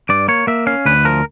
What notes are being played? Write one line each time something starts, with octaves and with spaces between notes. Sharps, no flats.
G2 D5
A#3 C#5
A#3 E5
C#4 F5
D2 B4
F3 A#4